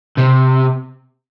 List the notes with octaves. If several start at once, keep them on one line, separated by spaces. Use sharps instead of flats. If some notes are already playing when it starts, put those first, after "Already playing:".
C3